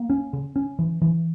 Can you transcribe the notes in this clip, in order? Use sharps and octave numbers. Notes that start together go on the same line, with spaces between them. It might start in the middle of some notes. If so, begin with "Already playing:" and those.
Already playing: A#3
C#4
C#3
C#4
E3
E3